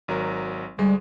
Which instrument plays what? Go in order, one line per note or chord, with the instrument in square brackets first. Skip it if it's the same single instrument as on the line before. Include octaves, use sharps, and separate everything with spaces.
[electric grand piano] G#1 F#3 A#4
[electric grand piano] D2 G#3 [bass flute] G3